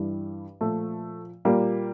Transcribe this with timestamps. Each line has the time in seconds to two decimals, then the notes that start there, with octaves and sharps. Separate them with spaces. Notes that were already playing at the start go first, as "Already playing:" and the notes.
Already playing: G2 E3 G3
0.61 A#2 F3 A3
1.45 A#2 G3 A#3